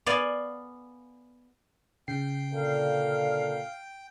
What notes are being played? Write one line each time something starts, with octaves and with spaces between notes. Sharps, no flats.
B3 D5 F5 G#5
C#3 G5 C7
A#2 D3 A4 F5